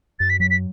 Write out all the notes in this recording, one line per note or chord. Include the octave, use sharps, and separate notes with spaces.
F#2 A6
B6
F#3 B6
B6